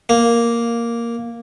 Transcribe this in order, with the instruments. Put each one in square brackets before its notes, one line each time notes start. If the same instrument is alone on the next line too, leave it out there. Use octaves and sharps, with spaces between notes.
[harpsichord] A#3